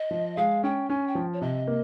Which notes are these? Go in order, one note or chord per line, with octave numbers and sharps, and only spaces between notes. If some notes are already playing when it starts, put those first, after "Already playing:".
Already playing: D#5
F3
G#3 F5
C#4 G5
C#4 G#5
G5
F3
C#5
C3 D#5
A#3